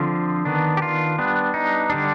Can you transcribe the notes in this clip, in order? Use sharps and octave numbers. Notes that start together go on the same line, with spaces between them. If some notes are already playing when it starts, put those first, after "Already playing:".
Already playing: D3 F3 C4 F4
D#3 B3 D4
G4
F4
G3 B3 D4
D#4
D3 G3 D4